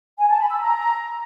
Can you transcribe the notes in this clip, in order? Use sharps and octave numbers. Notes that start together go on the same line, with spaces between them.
G#5
A5
B5
E6
A#5